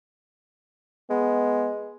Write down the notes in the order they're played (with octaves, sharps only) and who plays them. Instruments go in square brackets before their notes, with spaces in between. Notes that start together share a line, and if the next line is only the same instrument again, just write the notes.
[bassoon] G#3 [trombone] B3